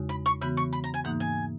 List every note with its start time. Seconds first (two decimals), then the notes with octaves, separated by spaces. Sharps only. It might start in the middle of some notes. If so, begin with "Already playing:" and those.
Already playing: E2 C#3 G#3 D#4 F#4
0.09 B5
0.26 C#6
0.42 C#3 E3 B3 F#4 B5
0.57 C#6
0.73 B5
0.84 A#5
0.94 G#5
1.04 G#2 E3 A#3 D#4 F#5
1.20 G#5